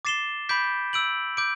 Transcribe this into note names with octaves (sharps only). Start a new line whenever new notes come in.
D6 A6 C7 E7 G7
B5 D6 G6 B6 D7
E6 G6 D7 F#7
D6 G6 D7